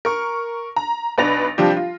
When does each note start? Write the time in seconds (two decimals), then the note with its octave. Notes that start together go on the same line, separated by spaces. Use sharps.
0.05 A#4 C#6
0.76 A#5
1.18 B1 D4 B4 A6 A#6 F7
1.58 C3 F3 G3 D4 G4
1.77 F4